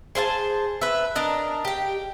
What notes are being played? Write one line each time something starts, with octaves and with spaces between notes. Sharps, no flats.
G#4 C5 E5 A5
B4 E5
D4 A#4 D#5
G4 G5